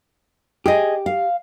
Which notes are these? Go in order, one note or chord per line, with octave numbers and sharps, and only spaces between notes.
G4 G#4 D#5
F5